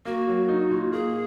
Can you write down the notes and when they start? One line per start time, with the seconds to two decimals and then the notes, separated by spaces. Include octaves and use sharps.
0.05 A#3 F#4
0.27 F#3
0.49 D#4
0.70 A#2
0.92 A#3 G#4